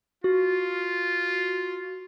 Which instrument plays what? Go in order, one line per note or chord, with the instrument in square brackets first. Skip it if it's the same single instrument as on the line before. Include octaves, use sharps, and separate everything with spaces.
[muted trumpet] F4 [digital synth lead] F#4